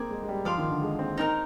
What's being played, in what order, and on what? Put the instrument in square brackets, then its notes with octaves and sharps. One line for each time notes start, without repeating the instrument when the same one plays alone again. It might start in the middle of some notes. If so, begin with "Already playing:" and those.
Already playing: [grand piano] A#3 C4 [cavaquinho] G#4 D5 G#5
[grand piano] G#3
G#3
G3
[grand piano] F3 [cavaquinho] D5 F5 C6
[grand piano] D#3
D3
G#3
C4
[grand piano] C4 [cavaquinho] D#4 G4 A#4